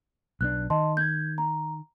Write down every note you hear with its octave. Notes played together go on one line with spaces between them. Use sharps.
B1 B3 D4 F#6
D#3 D#5 A5 C6
G6 G#6
A#5